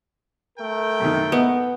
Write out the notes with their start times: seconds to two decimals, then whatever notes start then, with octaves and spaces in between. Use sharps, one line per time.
0.59 A3 A#4 G5
1.00 F#2 C3 D#3
1.32 B3 D#5